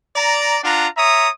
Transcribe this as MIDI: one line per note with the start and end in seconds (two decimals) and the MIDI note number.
0.15 0.57 74
0.15 0.57 82
0.63 0.86 62
0.63 0.86 65
0.63 0.86 78
0.63 0.86 82
0.97 1.28 73
0.97 1.28 76
0.97 1.28 82
0.97 1.28 87